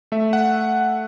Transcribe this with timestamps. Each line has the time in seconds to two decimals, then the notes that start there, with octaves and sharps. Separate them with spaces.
0.12 A3 E5
0.33 F#5